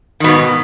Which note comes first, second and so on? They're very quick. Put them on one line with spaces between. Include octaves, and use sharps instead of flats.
D#3 B2 G#2